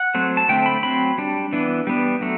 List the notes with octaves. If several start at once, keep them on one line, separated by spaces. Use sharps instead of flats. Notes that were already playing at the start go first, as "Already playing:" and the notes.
Already playing: F#5
F#3 A3 C4
A5
D3 A3 C4 G5
B5
F#3 C4 B5
G3 D4
E3 B3 D4
G3 B3 D4
F#3 A3